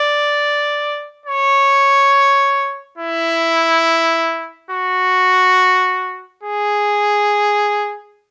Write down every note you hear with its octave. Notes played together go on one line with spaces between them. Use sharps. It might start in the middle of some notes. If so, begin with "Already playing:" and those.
Already playing: D5
C#5
E4
F#4
G#4